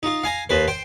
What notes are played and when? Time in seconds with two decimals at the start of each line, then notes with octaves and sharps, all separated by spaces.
0.03 D#4 F4
0.24 F5 G#5 A#5
0.50 D#2 B4 C5
0.68 C5 G5